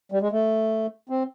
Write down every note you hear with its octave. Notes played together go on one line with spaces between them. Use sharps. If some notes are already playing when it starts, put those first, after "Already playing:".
G3
G#3
A3
C4